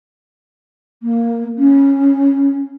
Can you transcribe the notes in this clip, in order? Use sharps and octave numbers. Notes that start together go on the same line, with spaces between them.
A#3
C#4